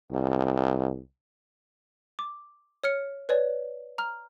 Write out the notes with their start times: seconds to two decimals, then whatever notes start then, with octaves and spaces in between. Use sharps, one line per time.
0.11 C2
2.19 D6
2.84 C#5 F6 C#7
3.29 B4 C#5 D5
3.98 A#5 F6